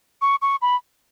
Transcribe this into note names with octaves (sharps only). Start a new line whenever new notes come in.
C#6
C#6
B5